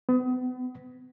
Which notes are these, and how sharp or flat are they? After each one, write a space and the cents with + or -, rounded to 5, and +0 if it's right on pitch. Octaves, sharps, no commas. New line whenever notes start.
B3 +40